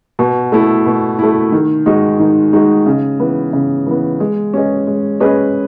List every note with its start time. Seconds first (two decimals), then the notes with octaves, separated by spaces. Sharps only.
0.19 B2
0.52 A3 E4
0.86 B2
1.19 A3 E4
1.52 D#3
1.86 G#3 D#4 F#4
2.20 D#3
2.53 G#3 D#4 F#4
2.86 C#3
3.20 E3 B3
3.53 C#3
3.86 E3 B3
4.20 G#3
4.54 C#4 G#4 B4 D#5
4.87 G#3
5.20 C#4 G#4 B4 D#5